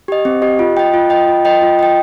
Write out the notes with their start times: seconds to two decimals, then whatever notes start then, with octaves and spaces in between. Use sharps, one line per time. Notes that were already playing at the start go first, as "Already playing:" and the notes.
0.08 G4 D#5
0.25 C4
0.42 G4 D#5
0.59 F4
0.77 D#5 G5
0.94 F4
1.10 D#5 G5
1.27 F4
1.45 D#5 G5
1.62 F4
1.79 D#5 G5